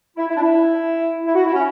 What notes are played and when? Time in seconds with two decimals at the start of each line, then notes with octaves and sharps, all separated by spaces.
0.17 E4
0.29 E4
0.37 D4
0.41 E4
1.26 E4
1.35 F#4
1.45 E4
1.53 C#4